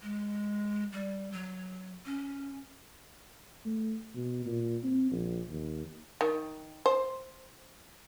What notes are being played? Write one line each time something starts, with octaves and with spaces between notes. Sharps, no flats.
G#3
G3
F#3
C#4
A3
B2
A#2
C4
A#1
D#2
D#3
C5